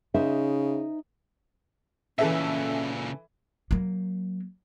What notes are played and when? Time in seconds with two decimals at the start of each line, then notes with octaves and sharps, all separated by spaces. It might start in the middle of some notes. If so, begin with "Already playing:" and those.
0.14 C#3 D#4 C5 E5
2.19 A#2 C#3 E3 C#4 A4 E5
3.71 F#3 A#3